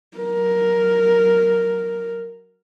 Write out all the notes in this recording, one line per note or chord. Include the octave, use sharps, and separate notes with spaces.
F#3 A#4